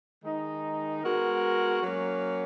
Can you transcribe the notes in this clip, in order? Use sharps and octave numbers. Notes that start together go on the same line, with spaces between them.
D#3 G#3 D#4
G#3 B3 F#4 A#4
F#3 A#3 C#4